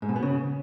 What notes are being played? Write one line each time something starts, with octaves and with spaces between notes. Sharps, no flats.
G#2
B2
B3
C#3